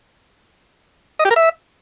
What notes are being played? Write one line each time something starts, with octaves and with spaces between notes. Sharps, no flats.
D#5
G4
A#4
E5